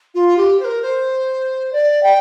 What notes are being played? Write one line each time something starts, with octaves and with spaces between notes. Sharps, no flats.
F4
G4
C5
A#4
C5
D5
G5